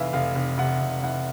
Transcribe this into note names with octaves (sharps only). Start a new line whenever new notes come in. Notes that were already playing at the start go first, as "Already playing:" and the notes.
Already playing: F1 E3 E5 F5
F1 F5
F1
C3 F#5
F1
E3 F#5